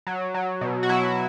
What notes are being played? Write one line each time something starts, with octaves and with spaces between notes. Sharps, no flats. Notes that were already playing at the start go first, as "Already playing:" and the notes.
F#3
F#3
B2
F#4
F#3 E4